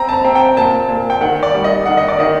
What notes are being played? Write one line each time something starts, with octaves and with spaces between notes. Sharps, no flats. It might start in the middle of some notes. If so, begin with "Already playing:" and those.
Already playing: C4 A#5
A5
A#5
C4
G5
A#2 A5
A#2
G5
D#3 F#5
D5
G3
D#5
D#3 F#5
D#5
D5
D#3 D#5